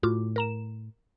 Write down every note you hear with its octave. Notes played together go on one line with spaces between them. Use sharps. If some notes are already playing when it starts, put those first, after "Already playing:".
A2 F4 F#4 D6
A#4 A#5 E7